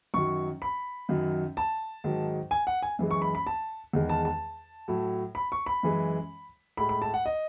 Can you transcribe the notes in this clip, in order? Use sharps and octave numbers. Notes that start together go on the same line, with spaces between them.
F#2 D#3 F#3 C#6
B5
F#2 D#3 F#3
A5
G#2 D#3 F#3
G#5
F#5
G#5
F#2 E3 G#3
C#6
B5
B5
A5
E2 D#3 G#3
A5
A5
A2 F#3
B5
C#6
B5
F#2 E3 G#3
A2 G#3 B5
B5
A5
F#5
D#5